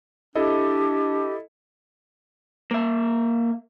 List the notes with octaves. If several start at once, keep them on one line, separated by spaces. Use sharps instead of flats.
D4 E4 G4 A4 D#5
A#3 E5